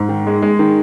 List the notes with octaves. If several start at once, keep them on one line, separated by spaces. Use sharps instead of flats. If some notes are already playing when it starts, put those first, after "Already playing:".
Already playing: G#2
D#3
G#3
G#3
D#3